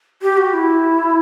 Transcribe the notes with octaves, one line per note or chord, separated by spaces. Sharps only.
G4
F#4
E4